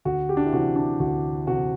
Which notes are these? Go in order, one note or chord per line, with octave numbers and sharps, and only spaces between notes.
D2 F#4
G4
D4
E4
C3 E3 F#4
D4
D2 F#4
C3 E3 F#4